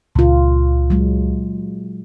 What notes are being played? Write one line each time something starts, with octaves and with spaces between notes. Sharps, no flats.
C#2 A#2 F4
F#3 G#3